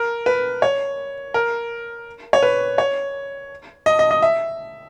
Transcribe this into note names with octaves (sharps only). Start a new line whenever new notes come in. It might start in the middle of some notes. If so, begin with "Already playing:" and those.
Already playing: A#4
B4
C#5
A#4
C#5
B4
C#5
D#5
D#5
D#5
E5